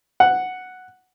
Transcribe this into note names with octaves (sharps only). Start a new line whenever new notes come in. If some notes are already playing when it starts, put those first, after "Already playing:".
F#5